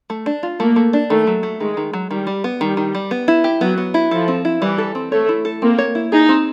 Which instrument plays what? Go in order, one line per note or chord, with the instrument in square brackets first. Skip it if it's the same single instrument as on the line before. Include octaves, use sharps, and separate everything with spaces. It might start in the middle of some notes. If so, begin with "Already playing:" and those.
[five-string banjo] A3
D4
F4
[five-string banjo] A3 [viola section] A#3
[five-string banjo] A3
D4
[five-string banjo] D#3 [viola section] A3
[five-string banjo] F#3
A3
[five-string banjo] D#3 [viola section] G#3
[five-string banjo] D#3
F#3
[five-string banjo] D#3 [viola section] G3
[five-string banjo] G3
B3
[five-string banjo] D#3 [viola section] G3
[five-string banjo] D#3
G3
B3
E4
G4
[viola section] F#3 [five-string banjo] B3
[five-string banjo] B3
E4
[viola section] F3 [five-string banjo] A4
[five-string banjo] C4
E4
[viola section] E3 [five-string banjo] G3
[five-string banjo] A4
C4
[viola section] A3 [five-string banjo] C#5
[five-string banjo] E4
A4
[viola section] A#3 [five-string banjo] C4
[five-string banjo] C#5
E4
[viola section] D#4 [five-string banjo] G#4
[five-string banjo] C4